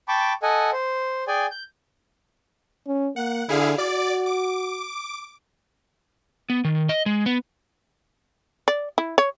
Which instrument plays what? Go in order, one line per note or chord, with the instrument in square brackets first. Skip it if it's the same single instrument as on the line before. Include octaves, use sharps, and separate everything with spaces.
[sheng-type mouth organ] G5 A5 B5 C#6 D6
A4 D#5 F#5 G#5
C5
G#4 D5 G5 G#5
G6
[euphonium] C#4
[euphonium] A#3 [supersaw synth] F#5
[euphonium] D3 [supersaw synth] E4 G#4 F5
[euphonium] F#4 [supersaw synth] D5 D6
[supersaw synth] D6
[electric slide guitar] B3
D#3
D#5
G#3
B3
[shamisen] D5
E4
C#5